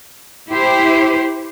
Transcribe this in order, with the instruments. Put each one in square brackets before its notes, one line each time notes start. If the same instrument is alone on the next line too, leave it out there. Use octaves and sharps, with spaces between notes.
[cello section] E4 G4 C5